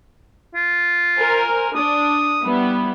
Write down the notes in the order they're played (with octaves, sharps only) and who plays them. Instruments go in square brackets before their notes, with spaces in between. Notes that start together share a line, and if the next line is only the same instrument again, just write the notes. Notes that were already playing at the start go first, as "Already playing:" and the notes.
[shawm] F4
[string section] A#4 C5 G#5
[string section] D4 [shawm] D#6
[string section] G3 B3 E4